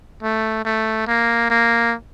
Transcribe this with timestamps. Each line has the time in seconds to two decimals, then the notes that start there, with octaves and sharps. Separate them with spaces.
0.22 A3
0.65 A3
1.07 A#3
1.50 A#3